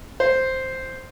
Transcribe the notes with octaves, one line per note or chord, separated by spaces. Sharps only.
C5